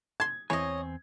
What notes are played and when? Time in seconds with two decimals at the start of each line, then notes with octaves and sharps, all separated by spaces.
0.20 A5 C6 G#6
0.50 E2 E3 C4 C#5 D#5 G#5